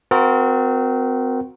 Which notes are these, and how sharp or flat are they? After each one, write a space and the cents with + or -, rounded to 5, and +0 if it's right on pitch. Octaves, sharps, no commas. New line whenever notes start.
C4 -30 F#4 -20 A#4 +0